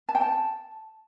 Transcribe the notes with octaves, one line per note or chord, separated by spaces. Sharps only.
A5
G5
A5